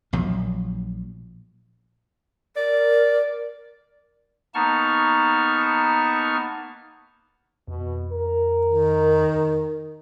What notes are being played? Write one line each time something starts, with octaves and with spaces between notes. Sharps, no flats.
A#1 A#2 F3 F#3
A#4 D5
A#3 B3 D#4 A5 C#6 F6
F2 B2
A#4
D#3